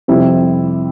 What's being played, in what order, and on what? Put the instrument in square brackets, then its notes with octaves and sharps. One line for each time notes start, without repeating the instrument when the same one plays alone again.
[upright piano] F2 C3 G3 C4 G4 [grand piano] E4